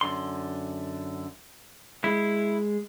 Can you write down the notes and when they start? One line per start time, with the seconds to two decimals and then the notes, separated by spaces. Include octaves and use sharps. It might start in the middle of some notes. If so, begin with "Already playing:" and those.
0.01 F#2 D3 C6
2.04 G#3 E4